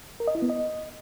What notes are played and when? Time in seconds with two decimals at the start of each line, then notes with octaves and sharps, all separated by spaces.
0.20 A#4
0.28 D#5
0.35 E4
0.42 B3
0.50 D#5